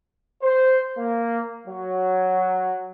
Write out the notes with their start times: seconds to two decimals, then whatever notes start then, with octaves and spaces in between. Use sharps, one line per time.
0.43 C5
0.97 A#3
1.67 F#3